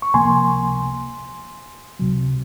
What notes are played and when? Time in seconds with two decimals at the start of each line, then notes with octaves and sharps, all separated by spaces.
0.02 C#6
0.14 C#2 C3 F3 A#3 G#5 C6
1.99 C#2 C3 F#3